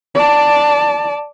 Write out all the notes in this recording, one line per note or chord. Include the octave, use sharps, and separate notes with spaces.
D5 A5